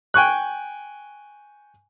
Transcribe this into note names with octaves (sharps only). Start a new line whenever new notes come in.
G5 G#5 C#6 F#6